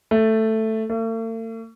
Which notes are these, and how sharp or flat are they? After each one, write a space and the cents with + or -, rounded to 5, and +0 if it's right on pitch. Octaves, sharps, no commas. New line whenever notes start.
A3 +5
A3 +45